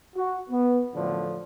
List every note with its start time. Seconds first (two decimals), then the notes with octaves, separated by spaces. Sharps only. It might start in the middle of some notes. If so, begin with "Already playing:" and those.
0.15 F#4
0.49 B3
0.93 F#2 A2 D3 F3 D4